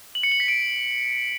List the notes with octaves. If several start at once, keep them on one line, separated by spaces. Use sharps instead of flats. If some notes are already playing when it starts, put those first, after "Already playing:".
F#7
C#7
F#7
B6
D7